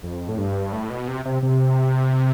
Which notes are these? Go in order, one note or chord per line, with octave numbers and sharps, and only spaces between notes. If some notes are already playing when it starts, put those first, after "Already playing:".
F2
A2
G2
A2
B2
C3
C3
C3